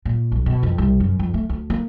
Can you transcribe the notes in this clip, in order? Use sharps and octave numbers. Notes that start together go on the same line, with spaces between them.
A#2
B1
B2
F2
C2
F#2
F2
A3
D2
A#3